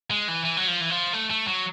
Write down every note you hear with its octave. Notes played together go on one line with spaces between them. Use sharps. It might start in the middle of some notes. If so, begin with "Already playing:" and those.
G#3
E3
E3
F#3
F3
E3
F3
A3
A3
F#3